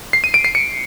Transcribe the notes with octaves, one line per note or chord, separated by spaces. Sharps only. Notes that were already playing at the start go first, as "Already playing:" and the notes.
C7
D#7
D7
C7
C#7